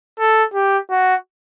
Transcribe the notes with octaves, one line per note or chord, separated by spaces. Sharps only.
A4
G4
F#4